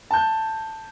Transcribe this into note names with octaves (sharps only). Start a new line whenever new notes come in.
A5 G6